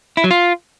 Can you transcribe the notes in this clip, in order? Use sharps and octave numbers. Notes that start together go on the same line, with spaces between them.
E4
F#3
F4